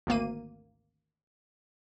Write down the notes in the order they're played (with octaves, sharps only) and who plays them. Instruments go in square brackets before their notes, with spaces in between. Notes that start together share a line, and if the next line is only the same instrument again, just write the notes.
[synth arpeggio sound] G#1 D2 A#3 D#7